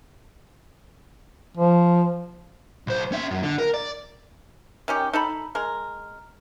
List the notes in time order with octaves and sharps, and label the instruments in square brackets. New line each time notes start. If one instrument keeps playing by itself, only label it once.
[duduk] F3
[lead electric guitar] B1 C5
C#4 E5
F#2
D3
A#4
D5
[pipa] D#3 C#4 G4
D#4 A4 B5
G#3 A#4